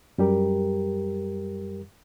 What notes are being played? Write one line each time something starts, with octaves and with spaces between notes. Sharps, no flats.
F#2 G3 G4 A#4